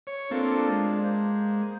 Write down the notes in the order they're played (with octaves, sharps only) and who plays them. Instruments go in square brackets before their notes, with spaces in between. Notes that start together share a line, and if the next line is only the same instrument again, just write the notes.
[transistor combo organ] C#5
[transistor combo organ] A#3 C4 A4 [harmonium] D4 F4
[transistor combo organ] G#3
[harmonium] A#3 C5